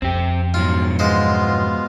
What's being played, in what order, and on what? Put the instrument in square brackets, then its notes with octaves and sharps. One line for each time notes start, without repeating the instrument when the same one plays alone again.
[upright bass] F2 [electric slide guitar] C4 G4
[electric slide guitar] G#2 B2 F#3 [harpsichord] F4
[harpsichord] G#3 C5 [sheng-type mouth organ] B3 F4 F5